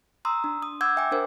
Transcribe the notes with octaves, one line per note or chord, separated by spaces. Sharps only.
A#5 C6 D#6 E6
D4
D#6
F#5 C6 D6 E6 G6 G#6
E5 G5 G#5 D6
D4 A#4 C5